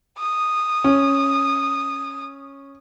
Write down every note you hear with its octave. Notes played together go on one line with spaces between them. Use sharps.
D#6
C#4